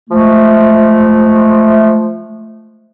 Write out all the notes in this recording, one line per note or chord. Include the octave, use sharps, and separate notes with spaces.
F3 G#3 A3